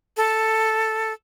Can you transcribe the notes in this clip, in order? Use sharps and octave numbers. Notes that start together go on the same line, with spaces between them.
A4